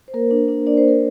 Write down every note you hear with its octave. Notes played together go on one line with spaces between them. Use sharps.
C5
A#3 A#4
D4
D4
D4 D5
C5
A#3 A#4